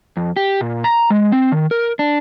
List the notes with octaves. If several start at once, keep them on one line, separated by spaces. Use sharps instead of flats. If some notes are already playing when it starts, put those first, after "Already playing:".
F2
G4
A#2
A#5
G#3
C4
D#3
A#4
D4